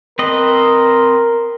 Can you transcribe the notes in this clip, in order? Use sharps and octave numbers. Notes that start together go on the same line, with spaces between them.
C4 A#4 B4 D#5